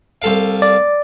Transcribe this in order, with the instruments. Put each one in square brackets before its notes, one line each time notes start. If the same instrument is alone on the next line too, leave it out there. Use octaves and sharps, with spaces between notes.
[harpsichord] C2 A4 F5
[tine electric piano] D5